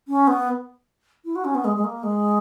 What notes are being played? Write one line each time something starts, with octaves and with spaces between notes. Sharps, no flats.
C#4
B3
E4
F#4
C#4
B3
G#3
G#3
A#3
G#3